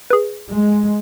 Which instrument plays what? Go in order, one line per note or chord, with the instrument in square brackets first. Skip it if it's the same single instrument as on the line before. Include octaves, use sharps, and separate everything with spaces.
[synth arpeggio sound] G#4 B4
[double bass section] G#3